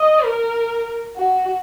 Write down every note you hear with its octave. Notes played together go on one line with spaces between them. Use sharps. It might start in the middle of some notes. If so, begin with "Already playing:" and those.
Already playing: D#5
A#4
F#4